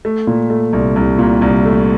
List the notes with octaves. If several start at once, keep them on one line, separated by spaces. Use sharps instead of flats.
A3
A#2
A3
C2
C2
A#2
C2
A3